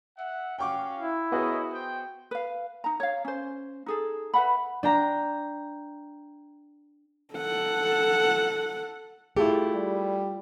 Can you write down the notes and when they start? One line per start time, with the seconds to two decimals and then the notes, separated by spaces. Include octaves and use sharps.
0.17 E5 F#5
0.59 C#4 F#4 F5 G5 C#6 D6
0.99 E4
1.32 B3 F#4 G#4 A#4 C#5 D#5
1.71 C5 G5
2.31 B4 F5
2.84 D#4 A#5
3.00 C#5 F5
3.25 C#4 C5
3.86 D#4 G#4 A4
4.34 B4 E5 F#5 B5
4.83 D4 G5 A#5
7.34 A4 F#5
9.37 A3 E4 F4 G4 G#4
9.75 G3